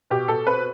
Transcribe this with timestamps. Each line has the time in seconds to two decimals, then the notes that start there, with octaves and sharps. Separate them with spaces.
0.10 B2 G4
0.28 B2 A4
0.46 C4 B4